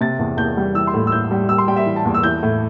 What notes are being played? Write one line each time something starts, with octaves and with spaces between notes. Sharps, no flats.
C3 A6
E2
E2 G6
G3
E3 E6
C6
A2
E6
A2 G6
G3
G3 E6
C6
G3 G5
E5
E3
A5
E2
E6
E3 G6
A2